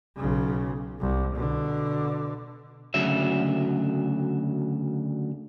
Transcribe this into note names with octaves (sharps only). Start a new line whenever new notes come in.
B1 C#3
C2
B2 D3
D2 C#3 F#3 E5